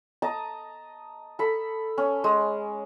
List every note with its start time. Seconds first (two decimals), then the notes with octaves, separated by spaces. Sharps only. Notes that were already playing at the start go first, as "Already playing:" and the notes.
0.22 D#5 A5 A#5
1.39 A4 B5
1.98 C#4
2.24 G#3